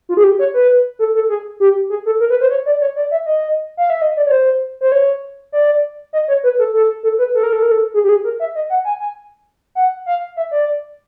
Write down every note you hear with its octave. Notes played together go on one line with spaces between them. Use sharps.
F4
G#4
G4
C#5
B4
A4
A4
G#4
G4
G#4
A4
A#4
B4
C5
C#5
D5
C#5
D5
E5
D#5
F5
E5
D#5
D5
C#5
C5
C5
C#5
D5
D#5
C#5
B4
A4
A4
A4
B4
A4
A#4
A4
A#4
A4
G#4
G4
G#4
A#4
E5
D#5
F#5
G#5
G#5
F#5
F5
E5
D5